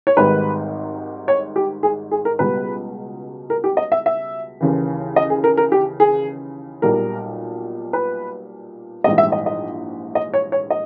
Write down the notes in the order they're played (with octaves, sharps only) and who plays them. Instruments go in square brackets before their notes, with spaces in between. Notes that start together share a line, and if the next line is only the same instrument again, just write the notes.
[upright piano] C#5
G#1 G#2 D#3 G3 B4
C#5
G4
G#4
G#4
A#4
C#2 B2 G3 B4
A#4
G4
D#5
E5
E5
D#2 C#3 E3
D#5
G#4
A#4
A#4
G4
G#4
B1 A#2 G3 A#4
B4
A#1 G#2 E3 G3 D#5
E5
D#5
D#5
D#5
C#5
C#5
D#5